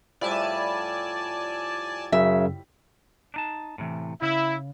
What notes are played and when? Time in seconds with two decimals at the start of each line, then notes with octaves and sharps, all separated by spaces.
0.21 A2 F3 G3 D5 G#5 A5
2.12 F#2 C#3 E5
3.34 D4 D#4 A5
3.78 A2 C3 E3
4.22 C#3 E4